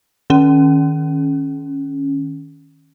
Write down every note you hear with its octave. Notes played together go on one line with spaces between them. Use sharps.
D#3 C#4